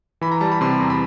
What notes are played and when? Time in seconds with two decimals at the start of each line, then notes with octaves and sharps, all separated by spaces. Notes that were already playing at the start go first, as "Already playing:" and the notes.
0.21 E3 B5
0.32 A#5
0.41 G3 A5
0.52 B5
0.61 C3 C6
0.70 B5
0.80 E2 A#5
0.90 B5